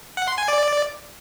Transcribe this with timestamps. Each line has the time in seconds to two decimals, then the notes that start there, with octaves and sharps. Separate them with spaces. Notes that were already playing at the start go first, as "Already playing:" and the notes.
0.17 F#5
0.28 C6
0.38 G#5
0.48 D5